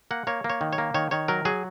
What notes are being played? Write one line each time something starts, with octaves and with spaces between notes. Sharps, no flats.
A#3 F#5
A#3 C#5
A#3
C#5
D#3
C#5
A#3
D#3 C#5
D#3 C#5
F#3 A#4
F#3 G#4